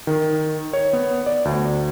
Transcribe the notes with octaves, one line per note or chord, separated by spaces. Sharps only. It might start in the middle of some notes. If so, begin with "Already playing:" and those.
D#3
C#5
B3
D5
D2